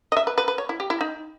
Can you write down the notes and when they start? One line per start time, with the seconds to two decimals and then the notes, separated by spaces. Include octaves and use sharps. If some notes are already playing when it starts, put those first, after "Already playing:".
0.12 D#5
0.17 E5
0.27 B4
0.38 B4
0.48 B4
0.58 C#5
0.69 E4
0.80 G4
0.90 E4
1.01 D#4